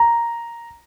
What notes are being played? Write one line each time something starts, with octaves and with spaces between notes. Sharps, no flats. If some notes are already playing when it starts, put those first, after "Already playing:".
Already playing: A#5